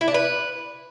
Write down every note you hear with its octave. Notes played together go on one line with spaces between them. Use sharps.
E4
D4
B4